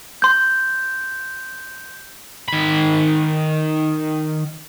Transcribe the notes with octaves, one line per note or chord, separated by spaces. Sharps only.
C6 G6
D#3 B5